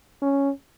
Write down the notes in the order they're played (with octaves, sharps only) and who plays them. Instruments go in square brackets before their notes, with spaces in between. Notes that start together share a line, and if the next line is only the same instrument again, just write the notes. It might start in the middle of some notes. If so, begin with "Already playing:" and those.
[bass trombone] C#4